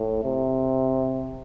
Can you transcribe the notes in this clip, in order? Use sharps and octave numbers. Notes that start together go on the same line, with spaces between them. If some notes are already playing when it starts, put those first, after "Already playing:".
Already playing: A2
C3